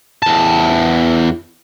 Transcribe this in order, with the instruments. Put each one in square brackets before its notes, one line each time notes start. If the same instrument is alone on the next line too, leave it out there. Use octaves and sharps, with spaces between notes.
[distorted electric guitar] E2 A5